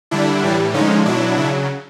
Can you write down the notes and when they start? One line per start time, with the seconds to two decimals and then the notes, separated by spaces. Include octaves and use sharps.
0.11 D3 G3 D4 E4
0.43 A2 E3 G3
0.73 D3 F3 G#3 C#4 D#4
1.05 B2 F#3 D4 E4
1.36 C#3 F#3